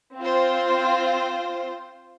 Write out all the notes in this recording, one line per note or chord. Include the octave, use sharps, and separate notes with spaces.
C4 F4 C5